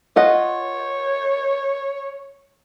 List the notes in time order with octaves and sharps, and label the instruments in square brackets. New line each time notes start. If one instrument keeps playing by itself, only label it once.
[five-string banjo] F4 D#5 F#5 [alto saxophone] C#5